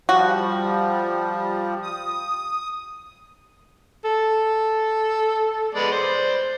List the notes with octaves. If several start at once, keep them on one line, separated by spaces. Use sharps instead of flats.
F3 G3 F#4
D#6
A4
G#3 B3 D5
C5 D5